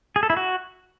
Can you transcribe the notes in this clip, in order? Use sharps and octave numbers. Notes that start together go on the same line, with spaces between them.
G#4
A4
E4
F#4